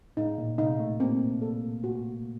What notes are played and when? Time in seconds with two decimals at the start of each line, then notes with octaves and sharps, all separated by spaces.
0.17 A2 D#4
0.38 A#2
0.58 C3 D#4
0.80 A3
1.00 A#3 C4
1.42 A4
1.84 F#4